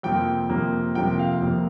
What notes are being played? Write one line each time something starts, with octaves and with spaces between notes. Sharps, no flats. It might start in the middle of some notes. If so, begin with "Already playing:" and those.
F2 C3 F3 A#3 G5
F2 C3 F3 A#3
F2 C3 F3 A#3 G5
F5
F2 C3 F3 A#3